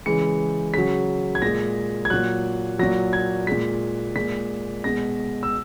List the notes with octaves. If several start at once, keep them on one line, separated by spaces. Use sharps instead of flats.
C#3 E3 G#3 C#7
C#3 F#3 B6
G#6
A#2 G#3 A#6
G#6
A#2 F#3 F#6
A#2 F#3 A#6
G#6
A#2 G#3 B6
A#2 G#3 B6
B2 G#3 A#6
E6